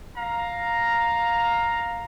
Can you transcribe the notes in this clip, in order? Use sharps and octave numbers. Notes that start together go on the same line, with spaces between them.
F5 A#5